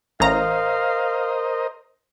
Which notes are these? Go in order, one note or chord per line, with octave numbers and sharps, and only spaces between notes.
A1 A#4 C5 D#5 F5 A#5